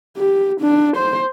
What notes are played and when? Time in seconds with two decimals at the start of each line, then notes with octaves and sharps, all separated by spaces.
0.17 G4
0.61 D4
0.96 C5